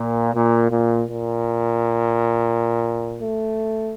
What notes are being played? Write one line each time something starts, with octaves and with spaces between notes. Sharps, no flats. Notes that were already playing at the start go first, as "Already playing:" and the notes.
Already playing: A#2
A#2
A#2
A#2
A3